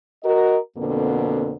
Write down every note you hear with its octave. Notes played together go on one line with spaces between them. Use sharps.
F#4 A#4 D#5
F2 B2 D3 A#3 C4 A4